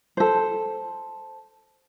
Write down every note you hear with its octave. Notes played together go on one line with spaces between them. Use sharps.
A4 C5